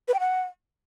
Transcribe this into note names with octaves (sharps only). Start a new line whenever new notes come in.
B4
G5
F#5